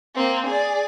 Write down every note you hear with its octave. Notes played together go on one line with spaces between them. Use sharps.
A#3 C4
G#4 D5